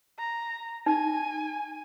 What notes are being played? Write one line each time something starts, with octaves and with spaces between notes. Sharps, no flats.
A#5
D#4 G#5